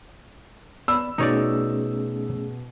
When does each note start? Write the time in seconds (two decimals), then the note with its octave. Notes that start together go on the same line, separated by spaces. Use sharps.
0.88 B3 D5 B5 E6
1.18 B2 A3 C#4 D#4 G#4 C#5 D5